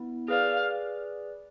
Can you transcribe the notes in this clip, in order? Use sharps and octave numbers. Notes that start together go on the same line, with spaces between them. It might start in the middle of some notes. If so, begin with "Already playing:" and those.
Already playing: B3 E4
G#4 B4 D5 F5